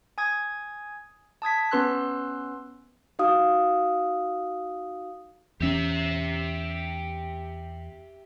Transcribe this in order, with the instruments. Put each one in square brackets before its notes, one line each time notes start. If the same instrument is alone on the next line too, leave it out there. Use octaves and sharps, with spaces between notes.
[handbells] G#5 D#6 G#6
A5 D#6 G#6 B6
B3 C#4 B4 C6 E6 F#6
[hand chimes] D#4 F#4 F5 D#6
[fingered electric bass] E2 C#4 [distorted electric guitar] G4 E5